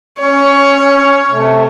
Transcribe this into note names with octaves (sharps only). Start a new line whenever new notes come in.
C#4 C#5
C3 A3